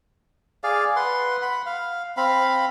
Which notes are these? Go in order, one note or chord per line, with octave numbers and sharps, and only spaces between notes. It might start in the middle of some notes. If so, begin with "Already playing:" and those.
G#4 D5 F5
B4 F#5 C6
F#5 B5
F5
C4 F5 B5